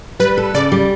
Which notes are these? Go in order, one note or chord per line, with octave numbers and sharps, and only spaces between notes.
G3 B4
A4
C#3 D5
G3